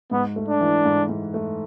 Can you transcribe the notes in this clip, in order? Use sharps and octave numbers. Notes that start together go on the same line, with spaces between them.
G#2 B3
A3
D4
E3
G#2
G#2
A3